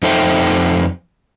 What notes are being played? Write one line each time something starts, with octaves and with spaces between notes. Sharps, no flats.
F2 D#4 A4 C5 E5 G5